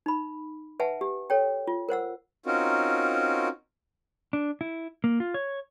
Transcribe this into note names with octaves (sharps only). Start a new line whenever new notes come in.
D#4 B5
B4 E5 F#5 G#5 A5
G4
A4 C#5 G5
F4
A#4 C5 F#5 E6
C4 C#4 D#4 F4 F#4 A#4
D4
E4
A#3
F4
C#5